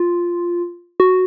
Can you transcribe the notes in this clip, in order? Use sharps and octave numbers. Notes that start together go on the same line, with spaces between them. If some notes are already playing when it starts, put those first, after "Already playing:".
Already playing: F4
F#4